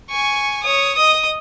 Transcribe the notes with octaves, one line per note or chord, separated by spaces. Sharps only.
G#5 C#6
C#5 D#6
D#5 D#6